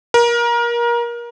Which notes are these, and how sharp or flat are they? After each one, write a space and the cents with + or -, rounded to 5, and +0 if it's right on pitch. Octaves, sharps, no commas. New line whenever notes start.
A#4 +25